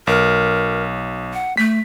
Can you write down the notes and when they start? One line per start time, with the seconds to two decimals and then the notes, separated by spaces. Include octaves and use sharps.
0.07 B1 A#4
1.33 F#5
1.57 A3 B6